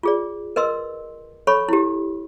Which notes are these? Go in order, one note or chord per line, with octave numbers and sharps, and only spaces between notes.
F4 G#4 D5
A#4 B4 D#5 C6 E6
A4 C#5 B5 C#6
E4 G4